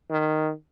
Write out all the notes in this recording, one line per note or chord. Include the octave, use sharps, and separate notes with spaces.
D#3